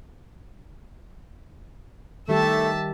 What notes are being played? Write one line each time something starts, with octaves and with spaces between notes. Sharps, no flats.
D#3 G3 A3 G4 E5 A5